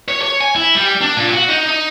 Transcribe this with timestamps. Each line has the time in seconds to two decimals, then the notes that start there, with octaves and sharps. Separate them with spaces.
0.08 C#5
0.22 C#5
0.40 G#5
0.56 E4
0.75 G3
1.01 D4
1.16 A#2
1.32 F#4
1.49 D#4
1.67 D#4